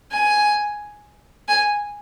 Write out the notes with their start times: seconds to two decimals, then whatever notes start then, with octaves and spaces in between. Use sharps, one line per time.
0.11 G#5
1.48 G#5